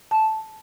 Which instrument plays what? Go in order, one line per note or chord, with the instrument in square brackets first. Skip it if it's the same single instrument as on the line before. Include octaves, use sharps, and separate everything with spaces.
[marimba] A5